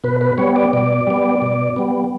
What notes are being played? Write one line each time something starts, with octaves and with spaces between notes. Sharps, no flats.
B2 B4
B4
G3 B3 C#5
D5
B2 D5
G3 B3
B2
G3 B3